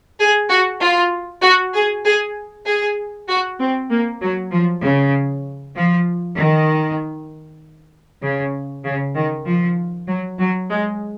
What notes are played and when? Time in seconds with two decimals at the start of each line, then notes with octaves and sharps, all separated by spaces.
0.19 G#4
0.49 F#4
0.81 F4
1.42 F#4
1.73 G#4
2.05 G#4
2.66 G#4
3.28 F#4
3.59 C4
3.90 A#3
4.21 F#3
4.52 F3
4.82 C#3
5.76 F3
6.36 D#3
8.22 C#3
8.84 C#3
9.16 D#3
9.46 F3
10.07 F#3
10.39 F#3
10.70 G#3